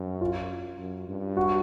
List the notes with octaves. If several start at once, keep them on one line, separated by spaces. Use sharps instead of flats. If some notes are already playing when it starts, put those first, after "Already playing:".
Already playing: F#2
F4
F#2
G2
F#4